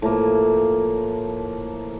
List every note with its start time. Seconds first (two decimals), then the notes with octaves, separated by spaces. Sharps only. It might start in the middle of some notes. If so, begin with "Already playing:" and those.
0.02 A2 F3 A#3